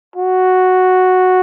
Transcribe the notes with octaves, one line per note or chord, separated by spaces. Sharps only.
F#4